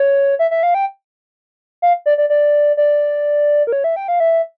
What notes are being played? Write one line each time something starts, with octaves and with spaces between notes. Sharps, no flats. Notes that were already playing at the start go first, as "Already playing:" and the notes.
Already playing: C#5
E5
E5
F5
G5
F5
D5
D5
D5
D5
A#4
C#5
E5
G5
F5
E5